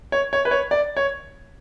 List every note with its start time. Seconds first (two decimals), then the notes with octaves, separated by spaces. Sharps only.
0.12 C#5
0.33 C#5
0.45 B4
0.51 C#5
0.71 D5
0.97 C#5